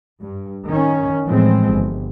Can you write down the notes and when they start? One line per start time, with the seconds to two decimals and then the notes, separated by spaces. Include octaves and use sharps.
0.21 G2
0.66 D#3 C#4
1.26 A2 E3 F3 G#3 C4
1.69 G1